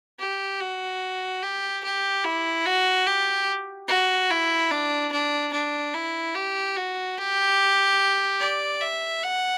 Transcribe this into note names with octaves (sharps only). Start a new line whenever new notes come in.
G4
F#4
G4
G4
E4
F#4
G4
F#4
E4
D4
D4
D4
E4
G4
F#4
G4
D5
E5
F#5